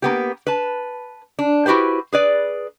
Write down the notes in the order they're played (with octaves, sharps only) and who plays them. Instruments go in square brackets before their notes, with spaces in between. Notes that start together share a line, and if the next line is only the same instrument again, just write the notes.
[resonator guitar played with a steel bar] A#3 B3 G4
B4 A5
D4
E4 F#4 G4 B4 C5
G#4 B4 D5